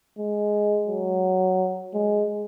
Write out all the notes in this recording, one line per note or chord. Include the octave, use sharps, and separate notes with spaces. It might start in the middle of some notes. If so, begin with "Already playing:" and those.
G#3
F#3
G#3